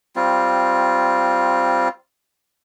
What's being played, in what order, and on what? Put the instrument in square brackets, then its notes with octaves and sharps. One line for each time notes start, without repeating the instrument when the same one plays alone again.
[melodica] G3 C4 F4